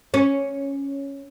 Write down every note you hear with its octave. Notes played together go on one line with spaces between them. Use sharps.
C#4